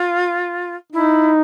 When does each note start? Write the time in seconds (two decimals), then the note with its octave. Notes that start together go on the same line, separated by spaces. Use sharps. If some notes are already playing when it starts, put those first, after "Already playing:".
Already playing: F4
0.93 D#4 E4